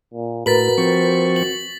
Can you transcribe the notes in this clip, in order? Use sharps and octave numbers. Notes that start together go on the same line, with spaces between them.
A#2
A2 F#4 A#4 B4 A6 B6 F#7
F3 C4 C#6
F#7